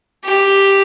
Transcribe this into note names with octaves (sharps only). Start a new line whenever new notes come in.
G4